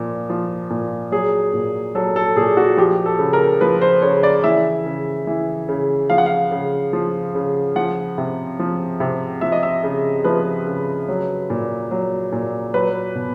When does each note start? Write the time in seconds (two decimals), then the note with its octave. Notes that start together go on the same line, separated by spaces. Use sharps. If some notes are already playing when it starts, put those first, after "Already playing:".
Already playing: A#2 F3
0.30 F3
0.70 A#2
1.12 F#3 G#4
1.53 A#2
1.95 F#3 A4
2.16 A4
2.36 A#2 G#4
2.57 F#4
2.77 F3 G4
3.06 A4
3.19 C#3
3.33 A#4
3.61 F3 B4
3.81 C5
4.02 C#3 C#5
4.23 D5
4.44 E3 E5
4.86 C#3
5.27 E3
5.69 C#3
6.10 F3 F5
6.18 F#5
6.26 F5
6.51 C#3
6.93 F3
7.35 C#3
7.76 F3 F#5
8.18 C3
8.59 F3
9.00 C3
9.41 F3 E5
9.52 D#5
9.63 E5
9.83 C#3
10.24 F3 B4
10.66 C#3
11.09 F#3
11.50 A#2
11.91 F#3
12.32 A#2
12.74 F#3 B4
13.15 B2